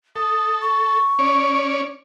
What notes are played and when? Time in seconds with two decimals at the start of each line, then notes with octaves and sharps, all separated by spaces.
0.16 A4 D#6
0.61 C#6
1.19 C#4 C#5 D5